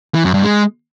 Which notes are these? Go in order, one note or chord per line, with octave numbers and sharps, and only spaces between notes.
E3
F#2
G2
G#3